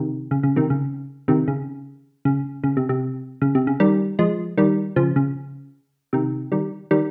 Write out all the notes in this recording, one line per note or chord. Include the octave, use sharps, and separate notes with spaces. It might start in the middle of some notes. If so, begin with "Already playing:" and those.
Already playing: C3 D#3
C#3
C#3
C3 D#3
C#3
C3 D#3
C#3
C#3
C#3
C3
C3
C#3
C3
C#3
D#3 G3
F3 G#3
D#3 G3
C#3 F3
C#3
C3 D#3
D#3 G3
D#3 G3